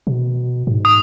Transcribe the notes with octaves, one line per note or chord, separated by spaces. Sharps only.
B2
G#2
D#6